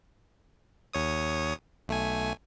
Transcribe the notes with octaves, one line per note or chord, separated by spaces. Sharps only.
D#2 C#5 D#6
B1 A3 G#5